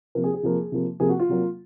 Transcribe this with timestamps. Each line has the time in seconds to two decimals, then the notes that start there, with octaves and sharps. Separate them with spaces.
0.15 C3 F3 A#3 A#4
0.24 G#4
0.34 G#4
0.43 C3 F3 A#3
0.72 C3 F3 A#3
1.00 C3 F3 A#3 G#4
1.09 F#4
1.19 F4
1.29 C3 F#3 A#3